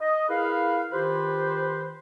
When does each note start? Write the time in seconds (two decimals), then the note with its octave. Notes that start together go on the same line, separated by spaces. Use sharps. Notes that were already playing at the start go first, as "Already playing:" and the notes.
0.01 D#5
0.30 E4 G#4 A#4 B4 F5
0.92 D#3 F4 G4 B4 C5